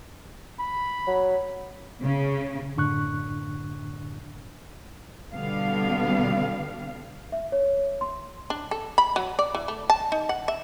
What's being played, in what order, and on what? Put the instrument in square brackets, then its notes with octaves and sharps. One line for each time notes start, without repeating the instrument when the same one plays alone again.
[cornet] B5
[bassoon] F#3
[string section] C#3
[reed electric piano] F#2 A2 D3 D4 C#6 F#6
[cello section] B2 D3 G3 B3 F5
[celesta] E5
C#5
C6
[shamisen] D4
A4
B5
F#3
D5
E3
A3
A5
D#4
F#5
E5